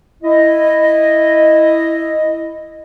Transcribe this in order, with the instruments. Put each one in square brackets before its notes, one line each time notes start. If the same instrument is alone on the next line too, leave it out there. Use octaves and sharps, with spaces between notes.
[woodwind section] E4 D#5